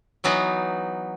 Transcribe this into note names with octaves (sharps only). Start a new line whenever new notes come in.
E3 F#3 B3 D#4